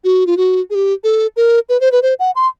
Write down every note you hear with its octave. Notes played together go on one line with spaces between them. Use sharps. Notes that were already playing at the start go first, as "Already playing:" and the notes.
F#4
F4
F#4
G#4
G4
A4
A#4
B4
C5
B4
C5
F#5
C6